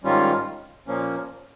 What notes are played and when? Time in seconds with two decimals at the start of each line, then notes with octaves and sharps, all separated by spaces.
0.04 G#2 D#3 G3 C#4 F4
0.87 A#2 F3 A#3 C#4